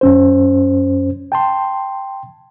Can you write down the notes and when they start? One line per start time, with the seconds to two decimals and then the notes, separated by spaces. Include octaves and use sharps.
0.01 F#2 C#4 C5
1.32 G5 A5 C6